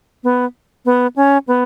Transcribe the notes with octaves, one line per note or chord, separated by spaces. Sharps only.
B3
B3
C#4
B3